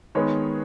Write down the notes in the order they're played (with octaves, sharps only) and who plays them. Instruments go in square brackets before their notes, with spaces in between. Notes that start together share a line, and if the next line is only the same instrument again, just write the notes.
[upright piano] D#3 G#3 B3 C#5